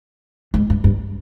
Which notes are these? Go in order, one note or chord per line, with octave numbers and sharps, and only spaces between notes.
G#2
G2
G2